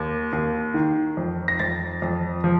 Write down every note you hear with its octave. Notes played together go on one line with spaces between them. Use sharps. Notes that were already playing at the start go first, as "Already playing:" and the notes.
Already playing: D#2
D#2
D#3
F2
A#6
F2 A6
F2
F3